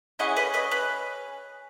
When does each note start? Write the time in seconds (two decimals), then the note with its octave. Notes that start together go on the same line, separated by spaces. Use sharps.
0.19 C#4 E4 G#4 D#5 F#5
0.36 B4 D#5
0.54 B4 D#5
0.71 B4